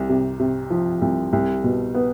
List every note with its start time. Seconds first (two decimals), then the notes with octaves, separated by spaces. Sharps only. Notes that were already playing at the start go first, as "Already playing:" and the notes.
Already playing: C2
0.09 C3
0.39 C3
0.70 F3
1.01 C2
1.33 C2
1.64 B2
1.94 B3